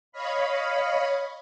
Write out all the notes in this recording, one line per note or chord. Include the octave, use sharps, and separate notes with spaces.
C#5 D#5 F5 B5